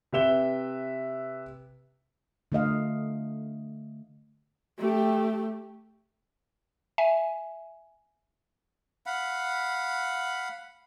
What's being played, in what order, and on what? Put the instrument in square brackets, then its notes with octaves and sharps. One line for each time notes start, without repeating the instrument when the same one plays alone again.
[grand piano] C3 B4 E5 E7 G7
[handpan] D3 A3 D#5 F5
[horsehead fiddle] A3 G4
[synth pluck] E5 G#5
[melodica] F5 F#5 B5